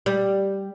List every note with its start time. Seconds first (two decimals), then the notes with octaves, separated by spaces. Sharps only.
0.06 G3